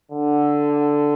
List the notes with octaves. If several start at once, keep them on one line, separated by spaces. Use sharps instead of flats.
D3